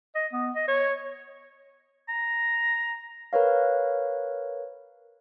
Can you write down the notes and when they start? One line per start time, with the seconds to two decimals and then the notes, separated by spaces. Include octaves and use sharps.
0.15 D#5
0.33 B3
0.55 D#5
0.68 C#5
2.09 A#5
3.33 A#4 B4 C#5 F5